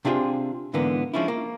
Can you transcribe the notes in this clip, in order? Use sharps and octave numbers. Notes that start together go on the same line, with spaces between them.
C3 D4 E4 F4 G#4 C5
G#2 D3 E3 A#3 B3
F3 G#3 C#4 D4 E4
A#3